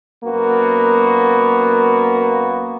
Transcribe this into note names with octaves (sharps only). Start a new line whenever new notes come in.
F#2 A#3 B3 F#4